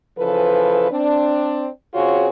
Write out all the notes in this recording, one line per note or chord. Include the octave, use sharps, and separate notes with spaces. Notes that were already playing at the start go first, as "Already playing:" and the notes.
C#3 E3 F3 A4 B4
C4 D4
C#3 C4 F4 F#4 G#4 C#5